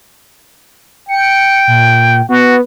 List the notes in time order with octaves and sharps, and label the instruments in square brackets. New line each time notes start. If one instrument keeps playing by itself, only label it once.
[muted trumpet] G5 [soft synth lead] C#7
[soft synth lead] A#2
[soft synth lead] B3 [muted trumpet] F#4